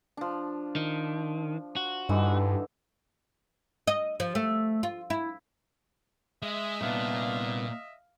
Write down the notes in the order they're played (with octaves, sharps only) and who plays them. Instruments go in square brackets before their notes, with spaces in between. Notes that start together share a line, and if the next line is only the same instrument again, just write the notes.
[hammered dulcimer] F3 D4
[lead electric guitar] D#3
F#4
[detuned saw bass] G2 [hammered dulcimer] D3 E3 D#4
[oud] D#5
F3
A3
F4
E4
[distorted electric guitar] G#3 [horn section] D#5 E5
[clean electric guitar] C2 B3 D4 [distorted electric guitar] A#2 [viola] F5